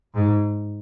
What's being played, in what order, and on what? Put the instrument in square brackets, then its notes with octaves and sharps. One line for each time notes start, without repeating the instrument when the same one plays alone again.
[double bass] G#2